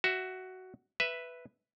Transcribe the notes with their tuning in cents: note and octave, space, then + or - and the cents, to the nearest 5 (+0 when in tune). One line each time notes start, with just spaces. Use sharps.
F#4 +10 E5 +5
B4 +0 E5 +5